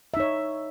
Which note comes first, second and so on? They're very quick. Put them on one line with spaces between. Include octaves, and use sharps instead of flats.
E5 D#4 C#5